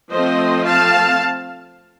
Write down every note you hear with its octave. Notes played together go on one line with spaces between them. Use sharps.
F3 A3 C4 C5 D#5
F5 A5